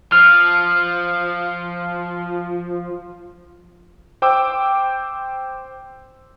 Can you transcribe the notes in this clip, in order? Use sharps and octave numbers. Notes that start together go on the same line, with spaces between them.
F3 F6
C5 G5 D6 E6